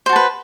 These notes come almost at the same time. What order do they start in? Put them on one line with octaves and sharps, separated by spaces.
C5 F#4 A5 B4